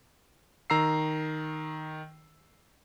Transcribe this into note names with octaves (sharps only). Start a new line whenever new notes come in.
D#3 A#5 E6 C7